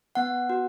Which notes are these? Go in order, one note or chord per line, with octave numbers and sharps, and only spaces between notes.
B3 F#5
F#4